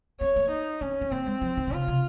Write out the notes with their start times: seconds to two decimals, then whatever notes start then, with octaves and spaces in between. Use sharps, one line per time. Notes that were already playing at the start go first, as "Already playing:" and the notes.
0.20 C4 C#5
0.36 A#3
0.51 D#4
0.81 C4 C#4
1.01 C4
1.12 A#3 C4
1.26 G#3
1.41 F3
1.57 D#3
1.67 C3
1.72 C#3 F4
1.88 C3